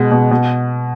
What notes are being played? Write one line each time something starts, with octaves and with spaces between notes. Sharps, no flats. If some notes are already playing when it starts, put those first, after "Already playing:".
Already playing: B2 G#3 F#5
B2
B2